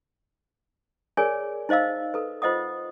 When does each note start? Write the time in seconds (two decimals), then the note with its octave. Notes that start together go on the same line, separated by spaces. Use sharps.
1.17 G#4 A#4 C#5 D5 G#5
1.69 D#4 C5 D#5 F5 E6
2.14 A4 B4
2.42 F4 C5 D#5 F#5 D#6